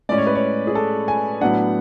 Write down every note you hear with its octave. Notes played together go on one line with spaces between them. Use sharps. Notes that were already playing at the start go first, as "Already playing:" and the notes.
A2 G#3 C#4 D5
C#5
B4
C#5
G#4
A4
G#5
A2 F#3 B3 D4 F#5